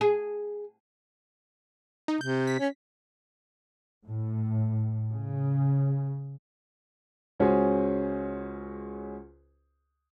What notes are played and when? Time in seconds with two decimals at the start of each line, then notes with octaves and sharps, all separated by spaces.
0.01 G#4
2.08 D#4
2.21 C3 G6
2.47 B6
2.59 C#4
4.07 A2
5.11 C#3
7.40 C#2 C#4 F#4 G#4 C5 G#5